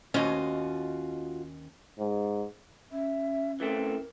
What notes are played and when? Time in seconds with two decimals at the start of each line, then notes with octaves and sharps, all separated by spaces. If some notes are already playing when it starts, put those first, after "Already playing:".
0.14 D#2 C#4 F4 F#4 D#5
1.99 G#2
2.91 C#4 E5
3.60 E3 A3 C4 A#4